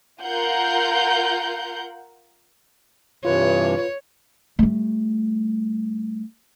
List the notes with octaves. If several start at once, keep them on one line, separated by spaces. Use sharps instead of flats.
F4 A#4 F#5 G6
G2 C3 E3 F4 B4 C#5
G3 A3